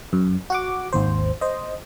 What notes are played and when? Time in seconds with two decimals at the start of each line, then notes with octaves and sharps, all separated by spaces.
0.13 F#2
0.50 F#4 F#5 D6
0.93 G#1 D#2 C5
1.41 C5 D#5